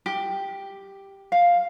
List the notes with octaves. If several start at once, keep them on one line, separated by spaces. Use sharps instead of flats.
G4
F5